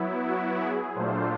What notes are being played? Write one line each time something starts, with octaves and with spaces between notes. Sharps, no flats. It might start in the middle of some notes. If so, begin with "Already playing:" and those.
Already playing: F#3 B3 E4
F#4
G#4
A#2 F#3 A3 D4 F4 C5